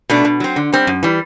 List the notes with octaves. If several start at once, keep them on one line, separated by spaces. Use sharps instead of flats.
B2 A3 D4
B2
F#3 C4
D3
G3 C4
F#2
E3 G3